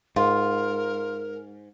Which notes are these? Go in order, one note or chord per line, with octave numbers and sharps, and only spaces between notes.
G#2 F4 A#4